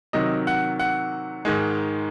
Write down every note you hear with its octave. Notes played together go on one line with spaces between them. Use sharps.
C3 D#3 F#3 D#5
F#5
F#5
G#2 D#3 G#3